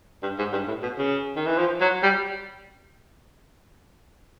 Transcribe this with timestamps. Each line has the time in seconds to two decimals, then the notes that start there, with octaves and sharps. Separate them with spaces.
0.23 G2
0.38 G#2
0.52 G2
0.68 A2
0.83 B2
0.98 C#3
1.36 D#3
1.46 E3
1.58 F3
1.81 F#3
2.03 G3